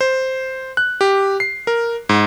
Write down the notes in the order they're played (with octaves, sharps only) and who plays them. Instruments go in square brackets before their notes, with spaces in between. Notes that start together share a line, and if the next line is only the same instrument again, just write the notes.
[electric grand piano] C5
F#6
G4
C7
A#4
G#2